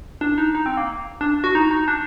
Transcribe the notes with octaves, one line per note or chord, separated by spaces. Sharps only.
D4
D#4
D#4
C4
A#3
D4
F#4
D#4
D#4
D4